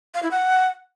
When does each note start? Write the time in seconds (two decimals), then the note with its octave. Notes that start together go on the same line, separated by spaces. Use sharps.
0.14 F5
0.23 E4
0.31 F#5